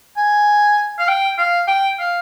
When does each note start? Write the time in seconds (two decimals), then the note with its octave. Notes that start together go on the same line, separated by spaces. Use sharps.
0.17 G#5
0.99 F5
1.08 G5
1.38 F5
1.68 G5
1.99 F5